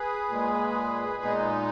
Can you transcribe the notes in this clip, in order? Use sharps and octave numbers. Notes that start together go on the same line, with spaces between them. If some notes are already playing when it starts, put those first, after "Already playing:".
Already playing: G#4 B4
A#2 G#3
A#2 G#3 B3 D#4